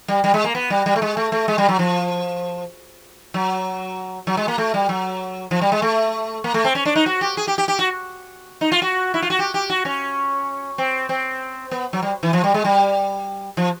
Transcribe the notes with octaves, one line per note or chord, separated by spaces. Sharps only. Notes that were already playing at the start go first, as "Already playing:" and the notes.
G3
G3
G#3
A#3
B3
G3
G3
A3
G#3
A3
A3
G#3
G3
F#3
F3
F#3
F#3
G#3
A#3
A3
G3
F#3
F3
G3
G#3
A3
A#3
A3
C4
C#4
D4
D#4
F#4
G4
G#4
G4
G4
G4
F#4
D#4
F4
F#4
E4
F4
F#4
G4
G4
F#4
C#4
C4
C4
B3
F#3
G3
E3
F3
G3
G#3
G3
F3